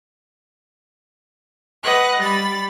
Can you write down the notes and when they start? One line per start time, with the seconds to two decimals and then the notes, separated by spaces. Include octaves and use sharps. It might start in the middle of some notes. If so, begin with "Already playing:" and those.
1.82 B4 D#5 F#5 F#6
2.20 G3 B5 A6